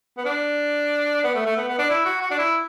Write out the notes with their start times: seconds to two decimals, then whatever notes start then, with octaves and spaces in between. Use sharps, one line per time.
0.18 B3
0.25 D4
1.24 B3
1.35 A3
1.46 A3
1.57 B3
1.68 B3
1.79 D4
1.90 E4
2.05 F#4
2.22 F#4
2.31 D4
2.39 E4